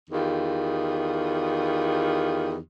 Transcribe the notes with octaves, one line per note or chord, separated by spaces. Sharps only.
E2 D#3 F4 G4